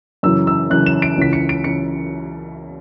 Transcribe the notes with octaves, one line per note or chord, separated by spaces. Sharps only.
F#2 C#3 E3 E6
E6
F#2 C#3 E3 F#6
E7
D7
C#2 C#3 E3 B6
C#7
D7
C#3 E3 C#7